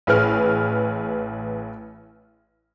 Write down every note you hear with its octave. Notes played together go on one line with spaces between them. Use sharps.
A1 G#4 B4 F6